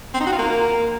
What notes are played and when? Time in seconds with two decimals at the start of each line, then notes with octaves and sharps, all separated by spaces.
0.14 C4
0.20 D#4
0.26 F#4
0.32 F4
0.38 A#3